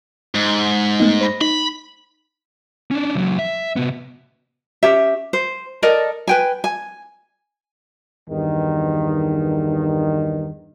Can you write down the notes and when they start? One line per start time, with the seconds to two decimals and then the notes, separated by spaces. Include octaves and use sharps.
0.35 G#2
1.00 A3 B3 D#4
1.21 C5 B5 A#6
1.41 D#4 B5
2.91 C#4 D4
3.14 C#2 F#3
3.39 E5
3.76 C3 B3
4.83 C#4 G4 E5
5.33 C5
5.82 A4 A#4 D5 D#5
6.27 B4 G5 G#5
6.64 G#5
8.28 E2 G2 D#3